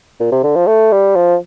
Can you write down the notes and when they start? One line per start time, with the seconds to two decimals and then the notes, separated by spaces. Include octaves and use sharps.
0.20 A#2
0.31 C3
0.43 D3
0.56 F3
0.67 A3
0.92 G3
1.16 F3